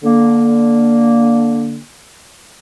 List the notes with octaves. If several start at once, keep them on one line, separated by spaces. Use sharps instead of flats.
D3 A#3